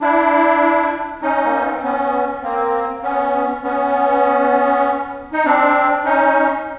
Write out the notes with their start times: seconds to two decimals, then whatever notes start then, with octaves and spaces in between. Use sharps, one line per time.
0.01 D4 E4
1.22 C#4 D#4
1.45 A#3
1.57 B3
1.69 C4
1.83 B3 C#4
2.42 A#3 C4
3.03 B3 C#4
3.64 B3 C#4
5.33 D#4
5.45 C4 D4
6.05 C#4 D#4